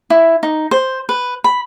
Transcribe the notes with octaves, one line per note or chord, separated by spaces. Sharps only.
E4
D#4
C5
B4
B5